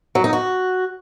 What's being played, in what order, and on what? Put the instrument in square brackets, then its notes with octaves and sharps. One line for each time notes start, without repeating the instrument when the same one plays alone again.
[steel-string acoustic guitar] F#3
D#4
F#4